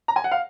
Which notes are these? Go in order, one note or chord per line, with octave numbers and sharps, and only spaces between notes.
A#5
G#5
F#5
F5